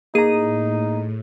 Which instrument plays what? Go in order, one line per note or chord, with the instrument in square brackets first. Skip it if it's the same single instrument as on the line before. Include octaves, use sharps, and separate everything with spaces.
[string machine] A2 [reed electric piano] A#3 A#5 [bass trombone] D#4 [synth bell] G#4 D#7